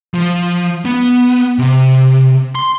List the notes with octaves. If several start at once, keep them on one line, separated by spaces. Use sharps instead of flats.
F3
B3
C3
C6